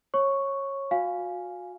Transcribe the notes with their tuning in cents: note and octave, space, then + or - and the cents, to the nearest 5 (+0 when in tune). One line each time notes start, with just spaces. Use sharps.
C#5 -20 C#6 +0
F#4 -35 F5 +0 G#5 +0